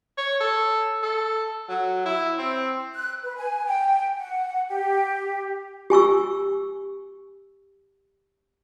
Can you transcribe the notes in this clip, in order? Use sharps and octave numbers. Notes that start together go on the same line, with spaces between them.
C#5
A4
A4
F#3
E4
C4
F#6
B4
G#5
G5
F#5
G4
G4 G#5 C#6 E6